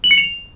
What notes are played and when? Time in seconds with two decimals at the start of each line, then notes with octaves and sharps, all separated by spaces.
0.04 F#7
0.11 C#7
0.18 F7